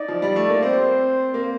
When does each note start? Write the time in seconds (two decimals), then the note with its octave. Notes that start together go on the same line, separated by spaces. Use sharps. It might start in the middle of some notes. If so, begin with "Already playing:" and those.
Already playing: D#4 D5
0.08 F3
0.22 G3
0.36 A3
0.49 A#3
0.62 C4 C5
1.34 A#3